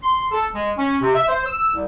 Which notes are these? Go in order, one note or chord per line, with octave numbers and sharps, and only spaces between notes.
C6
A4
G#3
C#4
C3
E5
C5
E6
C2